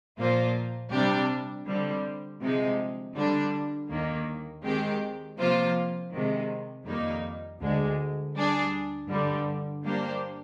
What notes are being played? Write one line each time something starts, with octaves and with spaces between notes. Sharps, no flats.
A#2 F3 A#3 F4 C5
C3 G3 D4 G4
D3 G3 C4
C3 F3 G#3 D#4
D3 G3 D4
D#2 D#3 A#3
D#3 G#3 C4 G4
C3 F3 A#3 F4 C5
C3 D#3 G#3
F2 D#3 G3 A#3 D#4
D2 D3 G#3
G3 D4 G#4
G2 D3 G3
G3 A#3 D4 G4 C5